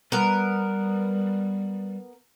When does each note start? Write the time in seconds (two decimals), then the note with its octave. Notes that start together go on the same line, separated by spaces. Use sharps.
0.12 G3 B3 A#4